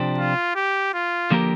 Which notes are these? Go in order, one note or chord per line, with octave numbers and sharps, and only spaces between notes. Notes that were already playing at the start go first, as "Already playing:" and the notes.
Already playing: C3 F3 D4 G4 C5
F4
G4
F4
D3 F3 A#3 G4 A#4